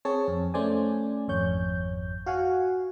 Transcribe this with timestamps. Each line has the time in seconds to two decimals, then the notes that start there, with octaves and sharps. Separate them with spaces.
0.05 C4 G#4 C#5 A5
0.28 F2
0.54 A3 C#4 C5 D5 G#5
1.28 G#1 F2 C#5 G6
2.26 F#4 F5 F#5 G#5